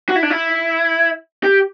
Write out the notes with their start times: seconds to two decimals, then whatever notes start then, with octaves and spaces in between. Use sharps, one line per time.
0.09 F#4
0.16 E4
0.23 D4
0.30 E4
1.43 G4